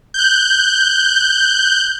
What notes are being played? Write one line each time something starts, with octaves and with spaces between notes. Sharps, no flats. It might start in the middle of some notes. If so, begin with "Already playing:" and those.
F#6 G6